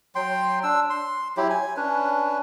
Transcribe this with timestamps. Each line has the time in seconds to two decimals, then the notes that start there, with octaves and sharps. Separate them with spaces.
0.15 F#3 G5 C6
0.63 D4 E6
0.90 C6
1.37 F#3 E4 G4
1.50 G#5
1.77 C#4 D4 B4